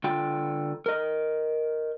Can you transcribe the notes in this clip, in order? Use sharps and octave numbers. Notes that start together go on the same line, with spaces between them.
D3 F4 G5
A#4 D#5